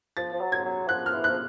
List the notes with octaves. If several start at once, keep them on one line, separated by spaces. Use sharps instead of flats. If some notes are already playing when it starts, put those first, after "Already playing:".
F3 A6
F3
F#3
G#6
F#3
F3 F#6
F6
E3
F#6
F3